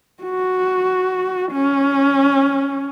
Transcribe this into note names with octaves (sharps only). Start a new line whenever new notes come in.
F#4
C#4